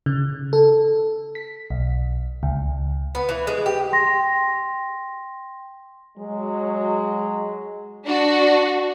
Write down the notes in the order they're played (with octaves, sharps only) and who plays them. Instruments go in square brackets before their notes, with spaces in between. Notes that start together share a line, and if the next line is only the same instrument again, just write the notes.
[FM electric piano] C#3
A4
B6
B1
C#2
[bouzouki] B3
E3
G#3
G4
[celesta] G5 C6 A#6
[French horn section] F#3 G#3
[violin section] D4 F#4